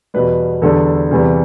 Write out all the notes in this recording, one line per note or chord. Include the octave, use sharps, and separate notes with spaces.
E2 B2 G3 B4
E2 D3 G3 A4
E2 C3 E3 G3